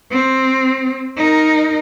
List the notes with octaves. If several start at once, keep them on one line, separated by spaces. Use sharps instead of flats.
C4
D#4 A#4